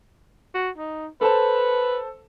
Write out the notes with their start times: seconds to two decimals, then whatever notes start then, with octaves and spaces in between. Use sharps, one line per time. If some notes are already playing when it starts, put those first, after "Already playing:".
0.54 F#4
0.78 D#4
1.21 A4 B4 C5 A5